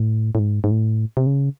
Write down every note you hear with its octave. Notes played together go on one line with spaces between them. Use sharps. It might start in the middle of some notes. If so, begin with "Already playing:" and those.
Already playing: A2
A2
G#2
G#2
A2
C3
C#3